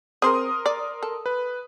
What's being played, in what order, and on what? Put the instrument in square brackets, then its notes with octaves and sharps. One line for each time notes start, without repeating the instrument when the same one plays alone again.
[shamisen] C4 G#4 C5 [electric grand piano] A#4 C6 D#6
[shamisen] D5
A4
[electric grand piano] B4